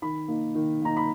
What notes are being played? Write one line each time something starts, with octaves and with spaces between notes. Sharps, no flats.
D#3 B5
A#3 D#4
D#3
A#3 D#4 A#5
B5